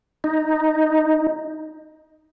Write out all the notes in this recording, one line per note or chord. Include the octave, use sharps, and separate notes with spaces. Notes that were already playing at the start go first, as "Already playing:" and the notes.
D#4